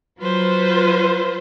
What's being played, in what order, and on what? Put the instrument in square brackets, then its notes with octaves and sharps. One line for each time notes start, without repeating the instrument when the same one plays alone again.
[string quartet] F#3 F4 B4 C5